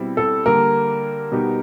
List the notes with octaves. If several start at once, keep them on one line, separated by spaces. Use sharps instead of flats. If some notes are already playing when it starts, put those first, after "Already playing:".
Already playing: B2 G3 C4 E4
A4
D3 G3 A#3 A#4
B2 G3 B3 D#4 G4